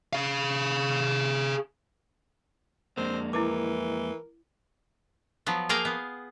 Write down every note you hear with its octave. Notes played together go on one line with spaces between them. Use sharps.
G#4 F5
F2 G#3 A#3 C4 D4
E3 E4 A#4 D6
F3 F#3 B3
A#3 G#4 A#4 F5 G5 A#5
B3